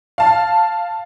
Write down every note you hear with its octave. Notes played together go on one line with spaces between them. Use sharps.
F5 A5